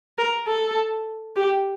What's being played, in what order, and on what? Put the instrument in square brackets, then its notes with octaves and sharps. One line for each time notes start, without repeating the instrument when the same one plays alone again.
[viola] A#4
A4
G4